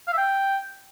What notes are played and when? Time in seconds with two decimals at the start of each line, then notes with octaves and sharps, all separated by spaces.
0.08 F5
0.13 E5
0.18 G5